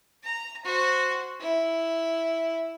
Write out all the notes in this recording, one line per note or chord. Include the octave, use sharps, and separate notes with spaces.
A#5
F#4 C5
E4